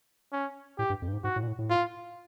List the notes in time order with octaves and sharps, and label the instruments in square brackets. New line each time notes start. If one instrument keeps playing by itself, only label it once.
[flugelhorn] C#4
[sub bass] A2 [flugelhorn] G4
[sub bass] G2
F2
G2
G#2
[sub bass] G#2 [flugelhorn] F#4
[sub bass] A2
A#2
A2
A2
[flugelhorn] F4